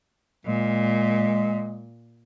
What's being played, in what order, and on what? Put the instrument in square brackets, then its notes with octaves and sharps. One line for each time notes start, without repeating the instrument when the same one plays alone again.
[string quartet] A#2 [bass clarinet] G#3